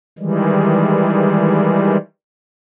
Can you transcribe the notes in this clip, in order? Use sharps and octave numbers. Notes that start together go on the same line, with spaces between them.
D#3 E3 G3 G#3